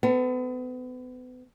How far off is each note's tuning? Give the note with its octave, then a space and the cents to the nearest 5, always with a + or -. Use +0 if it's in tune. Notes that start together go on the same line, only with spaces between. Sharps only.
B3 +35 A4 +20